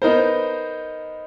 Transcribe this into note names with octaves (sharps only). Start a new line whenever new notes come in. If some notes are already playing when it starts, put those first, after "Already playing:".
B3 D#4 A#4 C5